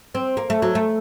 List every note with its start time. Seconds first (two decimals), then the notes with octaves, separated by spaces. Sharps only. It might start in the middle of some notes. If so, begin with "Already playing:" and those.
0.15 C4
0.37 A#3
0.50 A3
0.62 F#3
0.75 A3